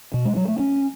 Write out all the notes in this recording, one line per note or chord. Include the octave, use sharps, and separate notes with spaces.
B2
G#3
F#3
A3
C#4